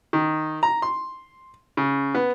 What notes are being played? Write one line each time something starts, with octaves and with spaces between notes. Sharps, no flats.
D#3
A#5
C6
C#3
B3